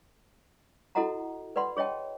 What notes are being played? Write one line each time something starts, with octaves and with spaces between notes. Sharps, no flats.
E4 F#4 A4 D#5 F#5 A#5
B4 D5 F#5 B5 C6
G#4 C#5 D#5 G5 A5